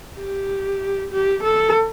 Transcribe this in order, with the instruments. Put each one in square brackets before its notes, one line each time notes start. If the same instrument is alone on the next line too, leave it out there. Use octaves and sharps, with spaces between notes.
[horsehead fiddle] G4
G4
A4